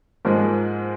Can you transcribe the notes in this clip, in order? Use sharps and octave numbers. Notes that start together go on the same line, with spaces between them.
G#2 F3 G#3 A#4